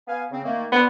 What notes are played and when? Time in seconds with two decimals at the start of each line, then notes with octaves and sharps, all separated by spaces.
0.08 B3 F5 G#5
0.30 C#3 C4
0.44 D#3 A3 A#3
0.72 B3 D4 F4